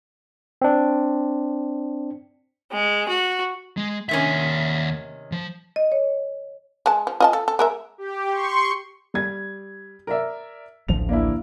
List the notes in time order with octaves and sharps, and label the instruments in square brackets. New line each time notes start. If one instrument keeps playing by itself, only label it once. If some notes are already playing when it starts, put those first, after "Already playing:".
[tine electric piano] C4 D4
[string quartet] G#3
F#4
[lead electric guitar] G#3
[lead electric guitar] D#2 E5 [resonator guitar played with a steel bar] C3 D#3 C#4
[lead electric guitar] F3
[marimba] D#5
C#5
[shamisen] G#3 A5
F3
F4 D#5 A5
A4
A4
G#3 A#4 E5
[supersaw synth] G4
C6 C#6
[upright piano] G3 G#6
A#4 D5 E5
[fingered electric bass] A1 D2 F3 [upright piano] F7
[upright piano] A#3 D4 E4